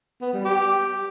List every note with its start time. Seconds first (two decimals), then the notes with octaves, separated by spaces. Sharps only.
0.21 B3
0.33 G3
0.45 G4